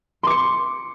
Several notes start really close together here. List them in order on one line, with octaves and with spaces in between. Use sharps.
C6 D6 C#7